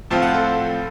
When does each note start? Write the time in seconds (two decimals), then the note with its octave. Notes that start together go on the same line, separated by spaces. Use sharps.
0.11 A2 F3 C4 F4 A5
0.22 F#5
0.34 A4